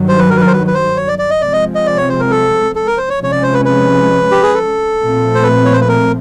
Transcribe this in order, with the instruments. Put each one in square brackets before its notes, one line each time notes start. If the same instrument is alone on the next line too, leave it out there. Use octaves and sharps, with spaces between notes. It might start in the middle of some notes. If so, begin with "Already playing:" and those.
Already playing: [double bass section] G2 D#3 F#3
[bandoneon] C5
B4
A#4
B4
A#4
C5
B4
B4
C5
C#5
D5
D5
D#5
[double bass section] C3 F3 G#3 C4 [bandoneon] D5
[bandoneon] D#5
D#5
D5
C#5
C5
A#4
A4
A4
A#4
C5
C#5
[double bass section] C3 F3 G#3 C#4 [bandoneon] C#5
[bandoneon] D5
C5
B4
B4
G4
G#4
A4
[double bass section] A#2 F3 A3 C4
[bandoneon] C5
B4
C#5
C5
B4
A#4